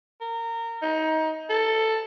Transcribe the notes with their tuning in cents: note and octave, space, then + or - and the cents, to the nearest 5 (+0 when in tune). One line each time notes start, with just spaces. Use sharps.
A#4 -20
D#4 +25
A4 +10